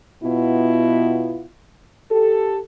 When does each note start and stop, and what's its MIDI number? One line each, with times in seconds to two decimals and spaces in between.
0.23 1.45 47
0.23 1.45 59
0.23 1.45 64
0.23 1.45 65
2.11 2.58 67
2.11 2.58 69